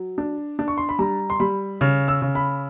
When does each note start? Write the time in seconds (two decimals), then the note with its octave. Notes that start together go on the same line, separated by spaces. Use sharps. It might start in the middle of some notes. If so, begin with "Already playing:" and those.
Already playing: F#3
0.18 D4
0.59 D4
0.68 C#6
0.77 C6
0.89 B5
0.99 G3 A#5
1.30 C6
1.40 G3 B5
1.81 C#3 F6
2.08 E6
2.22 C#3
2.35 B5